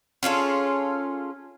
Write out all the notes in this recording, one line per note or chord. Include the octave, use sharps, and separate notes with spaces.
C#4 F4 G#4 A4